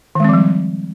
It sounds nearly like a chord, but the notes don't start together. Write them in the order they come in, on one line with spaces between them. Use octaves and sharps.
D#3 G#3 C4 F3 G3